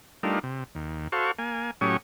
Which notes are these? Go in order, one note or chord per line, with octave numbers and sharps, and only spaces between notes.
G3 A3 D4 D#4 F4 A#4
C3
D#2
F#4 A4 C5 F5 C#6
A#3 G#5
A2 F#3 C#4 G4 C#6 D#6